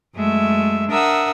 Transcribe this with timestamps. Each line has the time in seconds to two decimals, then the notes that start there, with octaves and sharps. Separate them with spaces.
0.14 F#2 G#3 A3 E5
0.88 D4 A#4 E5 F#5 D#6 E6